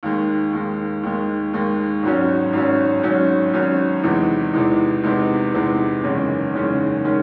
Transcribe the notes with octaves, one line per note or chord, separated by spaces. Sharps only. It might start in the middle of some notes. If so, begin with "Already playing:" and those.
D#2 D#3 G#3
D#2 D#3 G#3
D#2 D#3 G#3
D#2 D#3 G#3
G#1 G#2 F#3 C#4
G#1 G#2 F#3 C#4
G#1 G#2 F#3 C#4
G#1 G#2 F#3 C#4
E2 C3 E3 G#3 D#4
E2 C3 E3 G#3 D#4
E2 C3 E3 G#3 D#4
E2 C3 E3 G#3 D#4
F#1 E2 D#3 G#3 C#4
F#1 E2 D#3 G#3 C#4
D#3 G#3 C#4